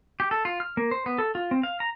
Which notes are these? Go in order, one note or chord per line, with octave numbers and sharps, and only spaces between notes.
G4
A4
F4
F6
A#3
C5
B3
A4
F4
C4
F5
A#5